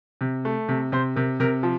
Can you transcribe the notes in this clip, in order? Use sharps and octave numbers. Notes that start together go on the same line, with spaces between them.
C3
A3
C3
C3 C5
C3 A#4
C3 A#4
F3